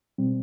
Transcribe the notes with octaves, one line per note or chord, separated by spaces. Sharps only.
B2 G3 C4